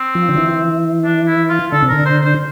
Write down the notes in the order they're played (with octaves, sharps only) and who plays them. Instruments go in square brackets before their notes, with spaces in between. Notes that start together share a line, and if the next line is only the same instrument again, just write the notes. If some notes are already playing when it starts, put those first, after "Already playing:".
Already playing: [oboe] C4
[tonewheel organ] F3
D3
E3
[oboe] D4
E4
F4
[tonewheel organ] D3 [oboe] A4
[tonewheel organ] C3
[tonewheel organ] D3 [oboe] A#4
[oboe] C5
C5